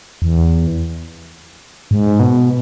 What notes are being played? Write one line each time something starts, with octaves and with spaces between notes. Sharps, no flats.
E2
G#2
B2